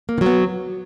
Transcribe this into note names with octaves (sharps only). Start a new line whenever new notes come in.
A#3
D#3
F#3 B3